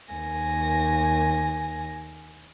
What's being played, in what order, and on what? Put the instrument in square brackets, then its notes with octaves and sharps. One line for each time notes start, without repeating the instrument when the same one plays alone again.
[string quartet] D#2 G#5 A#6